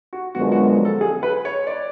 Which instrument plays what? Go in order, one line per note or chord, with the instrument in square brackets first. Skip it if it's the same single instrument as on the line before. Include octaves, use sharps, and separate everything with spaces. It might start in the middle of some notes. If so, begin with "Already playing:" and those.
[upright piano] F#4
[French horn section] F#2 D3 F3 G#3 B3 [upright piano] F#4
[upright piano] F#4
A4
G#4
B4
C#5
D5